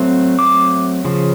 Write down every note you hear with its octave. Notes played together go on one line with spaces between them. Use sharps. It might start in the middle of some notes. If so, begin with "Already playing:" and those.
Already playing: F#3 A3 C4
D6
C#3 F3